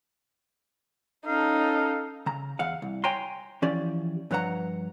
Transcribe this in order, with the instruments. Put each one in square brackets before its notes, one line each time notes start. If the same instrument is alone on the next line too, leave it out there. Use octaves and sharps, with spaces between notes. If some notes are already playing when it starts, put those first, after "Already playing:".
[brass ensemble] C#4 A4 [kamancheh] D#4 [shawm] F5
[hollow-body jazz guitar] C#3 A#5
E2 F5 F#5
C2
C#5 G5 G#5 A#5 C6
E3 F3 C#4 G4 D5
G2 F3 B4 C#5 F#5 A#5